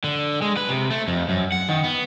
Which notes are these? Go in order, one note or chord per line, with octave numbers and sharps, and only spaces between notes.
D3
G#3
B4
C3
A3
F2
F#2
F#5
D#3
B3